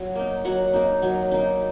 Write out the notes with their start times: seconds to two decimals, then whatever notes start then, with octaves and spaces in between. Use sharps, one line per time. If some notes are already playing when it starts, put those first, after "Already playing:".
Already playing: F#3
0.16 A#3 D#4
0.45 F#3 F#5
0.74 A#3 D#4
1.02 F#3
1.31 A#3 D#4